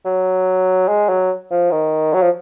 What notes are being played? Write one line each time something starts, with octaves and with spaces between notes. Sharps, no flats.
F#3
G#3
F#3
F3
D#3
F#3
F3